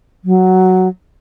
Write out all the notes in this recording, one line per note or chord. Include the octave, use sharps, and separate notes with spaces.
F#3